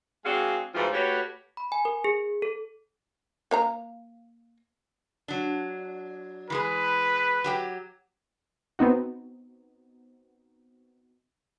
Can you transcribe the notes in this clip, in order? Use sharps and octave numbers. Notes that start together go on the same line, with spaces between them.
G#3 C4 D4 F#4 G#4 F5
D2 G#2 C3 E3 F3 F4
A3 F#4 G4 B4 C#5
B5
G#5
A#4
G#4
A4
A#3 F5 A#5
F#3 D4
E3 G#3 G#4 B4
F#3 G4 G5
B3 C4 D#4 F#4